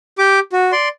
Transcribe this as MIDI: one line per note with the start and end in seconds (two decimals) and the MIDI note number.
0.18 0.40 67
0.18 0.40 86
0.52 0.72 66
0.72 0.89 74
0.72 0.89 84